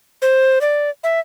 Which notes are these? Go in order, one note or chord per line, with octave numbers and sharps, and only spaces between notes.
C5
D5
E5